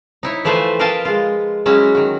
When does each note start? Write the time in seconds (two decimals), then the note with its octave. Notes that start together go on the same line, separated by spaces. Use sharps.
0.23 D#4 E4 C#5
0.45 E3 F3 A3 B4 C5 G#5
0.79 A#4 B4 D#5 F5 G5 A5
1.05 G#3 F4
1.66 F#3 G#3 C#4 E4 F#4
1.95 D#3 F#4